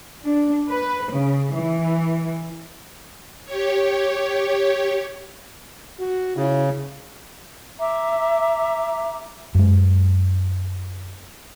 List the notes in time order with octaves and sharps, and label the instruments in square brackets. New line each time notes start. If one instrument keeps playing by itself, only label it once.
[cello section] D4
B4
C#3
E3
[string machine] G4 C#5
[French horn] F#4
[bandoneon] C#3 [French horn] E4
[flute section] E5 A#5 D6
[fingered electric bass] F#2 G#3